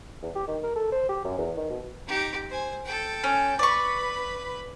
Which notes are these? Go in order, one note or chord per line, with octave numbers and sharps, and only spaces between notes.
E2
G4
D#3
A#4
A4
C5
G4
F#2
E2
D#3
B2
D#4 G4
C5 G#5
A4 G5
C#4
B4 D5 B5 C#6